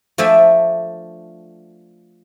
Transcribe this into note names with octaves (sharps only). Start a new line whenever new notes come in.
F3 A3 D4 D5 E5 G#5